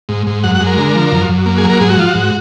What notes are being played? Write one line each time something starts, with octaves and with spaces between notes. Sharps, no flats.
G#2
G#2
F#2 F#5
F#5
G#3
A#4
D3
F3
F#2
F#2
A#3
G#4
F#3
A#4
G#2 G#4
F#4
F3 F4
F#4
G#2